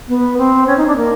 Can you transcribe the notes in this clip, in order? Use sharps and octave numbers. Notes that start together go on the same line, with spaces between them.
B3
C4
C#4
D#4
D4
A#3